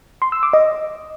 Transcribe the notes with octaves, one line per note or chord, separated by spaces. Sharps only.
C6
E6
D6
D#5